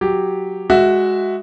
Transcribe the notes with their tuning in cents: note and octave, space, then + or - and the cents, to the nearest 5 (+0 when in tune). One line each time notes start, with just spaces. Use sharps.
F#3 +0 G4 +0
G#3 +0 F#4 +5 E5 +0